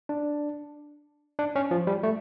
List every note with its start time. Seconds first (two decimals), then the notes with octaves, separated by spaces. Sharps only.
0.09 D4
1.39 D4
1.56 C#4
1.71 F3
1.87 G3
2.03 A3